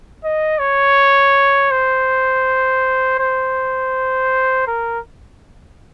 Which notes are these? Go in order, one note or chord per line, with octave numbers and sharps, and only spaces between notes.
D#5
C#5
C5
C5
A#4